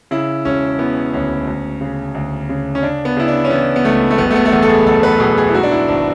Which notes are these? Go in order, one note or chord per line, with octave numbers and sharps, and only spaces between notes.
C#3 E4
E1 C#4
E3 B3
D2 C#4
D2
C#3
D2
C#3
C#4
C#3 D4
B3
C#3 E4
D4
C#4
E3 B3
B3
C#2 A3
A3
F#1 B3
A3
B3
A3
E2 B3
A4
G#4
F#1 A4
B4
B2 G#4
G#4
E4
G#2 F#4
D4
E4
G#1 D4